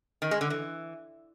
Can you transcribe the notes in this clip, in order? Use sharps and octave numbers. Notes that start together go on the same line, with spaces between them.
D#3
G#3
D3
E3